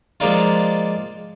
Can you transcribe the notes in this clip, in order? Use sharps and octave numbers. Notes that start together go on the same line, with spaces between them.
F3 G#3 A#3 D4 D#4 F4